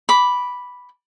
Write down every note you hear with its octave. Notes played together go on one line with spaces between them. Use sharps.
B5 D6